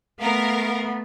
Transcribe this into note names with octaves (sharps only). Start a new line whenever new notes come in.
A3 B3 A#4 F5